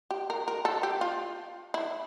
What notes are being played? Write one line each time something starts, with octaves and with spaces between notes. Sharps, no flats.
G4
A#4
A#4
A4
G4
F4
E4